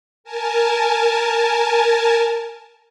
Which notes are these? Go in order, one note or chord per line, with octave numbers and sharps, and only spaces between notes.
A#4 G#5 A5